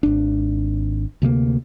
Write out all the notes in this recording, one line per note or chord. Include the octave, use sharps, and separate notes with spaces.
G#1 D4
D2 C3 G3 A#3